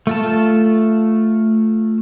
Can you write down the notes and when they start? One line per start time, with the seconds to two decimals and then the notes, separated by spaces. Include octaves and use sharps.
0.07 A3 F4 A5